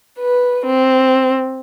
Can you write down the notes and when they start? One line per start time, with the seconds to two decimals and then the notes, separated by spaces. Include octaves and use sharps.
0.19 B4
0.66 C4